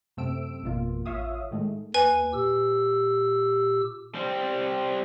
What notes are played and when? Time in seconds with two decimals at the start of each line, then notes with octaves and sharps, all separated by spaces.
0.17 F#2 C3 A3 C4 E6 D7
0.63 G#1 F2 B2 A#3 F4
1.06 A1 F4 C#5 E5 F5 D#6
1.51 A2 D#3 G#3 A3
1.94 D#2 B4 G#5
2.33 A#2 G4 E6
4.15 G3 C4